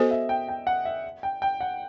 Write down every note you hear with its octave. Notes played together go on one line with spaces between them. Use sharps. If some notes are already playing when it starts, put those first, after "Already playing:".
Already playing: B3 F#4 A4 C5 D#5
E5
G5
G5
F#5
E5
G5
G5
F#5